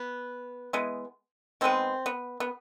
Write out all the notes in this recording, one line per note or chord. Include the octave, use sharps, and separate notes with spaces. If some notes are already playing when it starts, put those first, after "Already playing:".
Already playing: B3
E3 G#3 B3
D#3 G#3 B3 C4
B3
B3